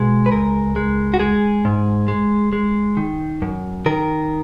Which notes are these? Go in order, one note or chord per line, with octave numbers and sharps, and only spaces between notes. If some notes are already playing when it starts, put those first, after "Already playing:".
Already playing: B2 G#3
B4
C#2 A#4
G#3
F#4
G#3 G#4
G#2
G#3
G#3
D#3
F#2
D#3 A#4